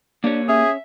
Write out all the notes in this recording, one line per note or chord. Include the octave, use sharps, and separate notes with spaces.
A#3 D4 G4 C#5
C#4 G#4 E5